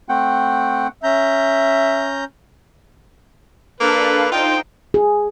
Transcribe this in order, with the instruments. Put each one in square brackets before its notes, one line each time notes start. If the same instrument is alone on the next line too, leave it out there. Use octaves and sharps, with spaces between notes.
[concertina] A3 C4 F#5 G5
[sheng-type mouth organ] C#4 A#5 G6 [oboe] E5
[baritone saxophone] A#3 [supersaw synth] D4 A4 F5 [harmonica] B4
[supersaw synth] D#4 C5 [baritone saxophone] F4 [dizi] G5
[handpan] G#4